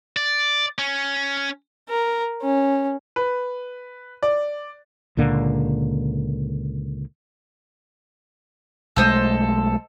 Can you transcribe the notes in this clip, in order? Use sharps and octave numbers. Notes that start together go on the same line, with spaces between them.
D5
C#4
A#4
C#4
B4
D5
C#2 A#2 D3 A#3
B1 G#3 A3 A4 C5 D#5